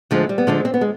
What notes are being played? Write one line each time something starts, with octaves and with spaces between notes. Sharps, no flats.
D2 D3 F3 G#3
G3
B3
D2 D3 F3 G#3
C4
B3
G#3